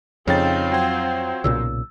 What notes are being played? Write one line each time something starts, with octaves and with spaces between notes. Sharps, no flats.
F2 C#3 C4 D#4 F4 C#5 G5 A6
F#3 C5 F#5 G5 G#6
B1 A#2 C#3 E6